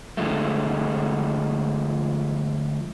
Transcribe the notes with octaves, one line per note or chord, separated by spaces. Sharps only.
D3 F3 G#3 A3